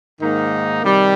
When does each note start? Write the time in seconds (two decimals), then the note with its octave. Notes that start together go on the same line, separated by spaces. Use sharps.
0.21 G#2 D#3 A#3 D#4
0.83 C3 D#3 G3